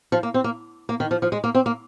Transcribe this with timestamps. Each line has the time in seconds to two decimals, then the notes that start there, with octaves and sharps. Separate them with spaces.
0.12 F3
0.23 A#3
0.34 C4
0.44 A#3
0.89 A#3
1.00 D#3
1.11 F3
1.22 F3
1.32 G#3
1.44 A#3
1.55 C4
1.66 A#3